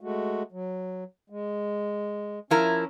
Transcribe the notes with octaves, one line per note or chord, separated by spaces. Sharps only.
G#3 A3 F#4
F#3
G#3
F3 C#4 E4 A#4